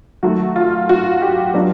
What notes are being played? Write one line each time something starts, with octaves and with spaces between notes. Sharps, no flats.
D#3 F#3 A3 F#4
F4
F#4
G4
F#3 B3 D4 F4